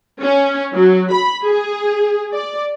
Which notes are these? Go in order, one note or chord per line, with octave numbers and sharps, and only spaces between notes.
C#4
F#3
B5
G#4
D5